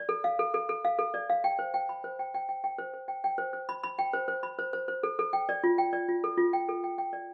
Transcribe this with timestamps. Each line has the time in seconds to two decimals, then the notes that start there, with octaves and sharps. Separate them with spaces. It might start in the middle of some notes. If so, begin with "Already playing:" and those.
Already playing: D5
0.09 A4
0.24 F5
0.39 A4
0.54 A4
0.69 A4
0.85 F5
0.99 A4
1.14 D5
1.30 F5
1.44 G5
1.59 C5
1.74 G5
1.89 B5
2.04 C5
2.19 G5
2.34 G5
2.49 G5
2.64 G5
2.78 C5
2.94 C5
3.08 G5
3.24 G5
3.38 C5
3.53 C5
3.69 B5
3.83 B5
3.99 G5
4.13 C5
4.28 C5
4.43 B5
4.59 C5
4.73 C5
4.88 C5
5.03 A4
5.19 A4
5.33 G5
5.49 D5
5.64 F4
5.78 G5
5.93 D5
6.09 F4
6.24 A4
6.38 F4
6.53 G5
6.69 A4
6.84 G5
6.98 G5
7.13 D5